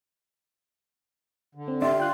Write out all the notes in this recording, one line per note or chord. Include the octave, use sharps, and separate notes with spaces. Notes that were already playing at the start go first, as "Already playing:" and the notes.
D3
C4
D4 G4 E5 C6
F4 G5 F#6